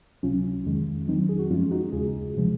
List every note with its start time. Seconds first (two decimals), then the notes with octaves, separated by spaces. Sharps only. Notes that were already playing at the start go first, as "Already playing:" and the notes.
0.23 C#2 C3 F#3 C#4 F4
0.66 F2 D#3 G#3
1.07 F2 D#3 F#3 C4 D#4
1.29 G#4
1.39 F#4
1.50 F#2 F3 G#3 C#4 F4
1.71 D#4 F#4
1.92 D#2 C#3 G#3 F4 G#4
2.36 C3 F3 G#3